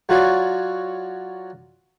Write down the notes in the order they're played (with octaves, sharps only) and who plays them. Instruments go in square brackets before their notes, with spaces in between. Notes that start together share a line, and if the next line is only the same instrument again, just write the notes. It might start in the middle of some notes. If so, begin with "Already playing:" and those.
[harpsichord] F#3 F4 F#4 C#5 D5